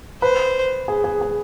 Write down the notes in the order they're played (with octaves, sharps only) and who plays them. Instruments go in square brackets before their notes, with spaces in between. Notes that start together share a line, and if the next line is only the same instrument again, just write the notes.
[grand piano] B4 [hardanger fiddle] C5
[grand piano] G#4
G#4
G#4